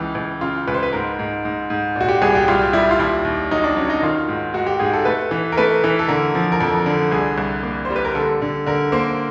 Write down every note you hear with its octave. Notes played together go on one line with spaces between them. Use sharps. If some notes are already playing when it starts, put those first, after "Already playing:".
Already playing: C#2 E3
C#2
C#3 F4
C#2 B4
C5
B4
G#2 A#4
G#2
G#2
G#2
A#2 F#4
G4
C2 G#4
G4
C2 F4
G3 E4
F4
D#2 E4
D#2
F#3 D#4
D4
F#3 C#4
D#4
D#3 F4
G#2
G#2 F#4
G4
G#2 G#4
A4
A3 B4
E3
A#4
A3 B4
E3
A4
D3 A#4
F3
A#4
F2 A4
D3
C2 G#4
C2
A#3
C5
G3
B4
A#4
D3 A4
D3
D3 A#4
A#3 C5